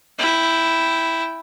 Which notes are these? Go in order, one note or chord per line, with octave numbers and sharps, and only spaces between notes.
E4 G5